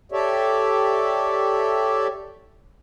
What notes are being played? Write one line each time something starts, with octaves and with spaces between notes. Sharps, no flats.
G4 A4 C#5 D5 E5